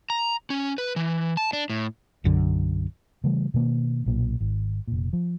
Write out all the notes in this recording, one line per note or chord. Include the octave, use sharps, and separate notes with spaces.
A#5
C#4
B4
E3
A5
D4
A2
B1 F#2 D3
C#3 E3 G3 A3
B2 D#3 A#3
B1 A#2
G#1
F1 A#2
F3